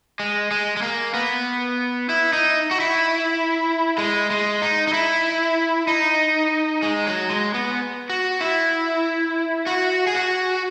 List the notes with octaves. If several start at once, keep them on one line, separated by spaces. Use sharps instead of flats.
G#3
G#3
G#3
A#3
B3
E4
D#4
F#4
E4
G#3
G#3
D#4
D#4
E4
D#4
G#3
F#3
G#3
B3
F#4
E4
F#4
G#4
F#4